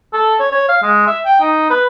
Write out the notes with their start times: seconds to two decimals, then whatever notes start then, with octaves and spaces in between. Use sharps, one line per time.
0.13 A4
0.40 C#5
0.52 C#5
0.68 F5
0.83 G#3
1.07 E5
1.25 G5
1.40 D#4
1.70 B4